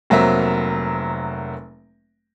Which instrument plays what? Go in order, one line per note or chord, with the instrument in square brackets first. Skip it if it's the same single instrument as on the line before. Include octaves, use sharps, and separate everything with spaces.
[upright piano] F1 F#3 A#3 C4 E5 A#5